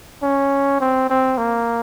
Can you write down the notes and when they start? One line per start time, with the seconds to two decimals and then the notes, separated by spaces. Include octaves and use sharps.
0.23 C#4
0.80 C4
1.10 C4
1.38 A#3